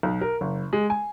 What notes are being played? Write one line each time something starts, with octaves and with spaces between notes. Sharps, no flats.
B1
A#4
F#1
G#3
G#5